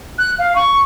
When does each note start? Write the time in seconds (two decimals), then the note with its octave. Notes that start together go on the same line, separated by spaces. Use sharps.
0.18 F#6
0.39 F5
0.56 C#6